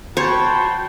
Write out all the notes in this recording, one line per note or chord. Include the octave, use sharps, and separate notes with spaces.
F#4 C5 C#5 G5 A5 B5